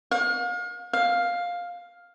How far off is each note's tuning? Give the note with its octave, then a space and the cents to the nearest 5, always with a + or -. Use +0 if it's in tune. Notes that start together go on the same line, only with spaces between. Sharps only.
F5 +40
F5 +10